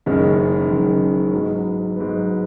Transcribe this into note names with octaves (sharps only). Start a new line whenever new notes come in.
F#1 F#2 D#3 G#3 C#4
F#1 F#2 D#3 G#3 C#4
G#2 F#3 B3
G#2 F#3 B3